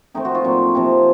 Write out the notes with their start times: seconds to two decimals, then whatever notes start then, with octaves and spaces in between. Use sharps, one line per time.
0.14 D#3 A3 C4 D#4
0.25 F#4
0.35 F4
0.44 A#2 F#3 C4
0.75 C3 F3 C4